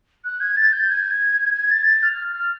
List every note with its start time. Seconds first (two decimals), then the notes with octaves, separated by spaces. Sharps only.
0.24 F#6
0.40 G#6
0.57 A6
0.72 G6
0.89 G#6
1.54 G#6
1.71 A6
1.86 A6
2.03 F6
2.34 F6